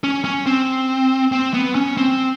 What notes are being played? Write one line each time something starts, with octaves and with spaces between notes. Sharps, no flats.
C#4
C#4
C4
C4
B3
C#4
C4